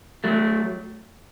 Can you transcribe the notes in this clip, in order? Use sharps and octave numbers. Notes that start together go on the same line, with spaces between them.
F#3 A3